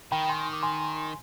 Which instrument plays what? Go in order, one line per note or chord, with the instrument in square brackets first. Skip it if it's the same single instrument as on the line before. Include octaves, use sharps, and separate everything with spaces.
[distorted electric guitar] D#3 [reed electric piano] G5 B5
[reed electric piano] G#5 C6
D6
G#5 C6